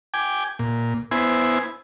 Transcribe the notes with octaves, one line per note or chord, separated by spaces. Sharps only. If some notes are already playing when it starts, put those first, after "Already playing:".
G5 G#5 D6
A#2
B3 E4 C5 G#5